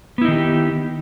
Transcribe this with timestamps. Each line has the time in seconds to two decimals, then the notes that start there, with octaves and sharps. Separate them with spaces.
0.18 B3
0.21 E4
0.25 D#4
0.28 D#3
0.31 G4